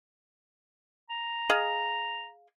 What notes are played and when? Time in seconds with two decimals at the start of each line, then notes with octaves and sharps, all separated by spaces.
1.10 A#5
1.50 G#4 D#5 F5